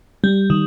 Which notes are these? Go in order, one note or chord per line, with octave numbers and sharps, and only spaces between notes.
G3
D#3